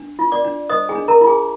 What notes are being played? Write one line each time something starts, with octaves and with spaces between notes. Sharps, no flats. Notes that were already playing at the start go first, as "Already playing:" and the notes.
Already playing: D4
F4
D5 D6
D4
C5 D#5 D#6
G#4 G#5
D4
A#4 A#5
F4
G#4 G#5